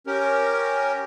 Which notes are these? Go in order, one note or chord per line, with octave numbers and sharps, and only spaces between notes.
C#4 G4 A#4